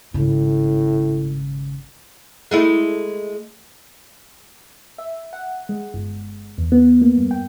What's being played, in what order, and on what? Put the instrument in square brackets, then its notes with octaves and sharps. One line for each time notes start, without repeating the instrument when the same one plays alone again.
[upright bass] G#1 C#3 [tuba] A2
[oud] G#3 A3 E4
[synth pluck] E5
F#5
G#3
G1
E2
B3
A#3
G2
G5